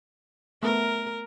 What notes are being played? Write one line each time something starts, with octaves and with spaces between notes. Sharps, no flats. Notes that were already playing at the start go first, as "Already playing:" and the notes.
A3 B3 A#4